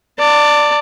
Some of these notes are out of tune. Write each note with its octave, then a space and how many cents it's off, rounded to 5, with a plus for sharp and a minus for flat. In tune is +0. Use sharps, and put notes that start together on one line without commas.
D5 +0 A5 +35